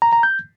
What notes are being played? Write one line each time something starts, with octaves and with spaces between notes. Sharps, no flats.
A#5
A#5
G6